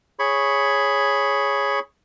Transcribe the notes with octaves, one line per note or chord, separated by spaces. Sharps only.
G#4 C#5 B5 C#6